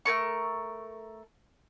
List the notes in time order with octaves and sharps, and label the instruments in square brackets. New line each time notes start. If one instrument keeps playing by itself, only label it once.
[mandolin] A3 G#4 A#4 C#6